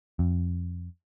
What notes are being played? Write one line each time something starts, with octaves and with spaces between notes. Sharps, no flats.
F2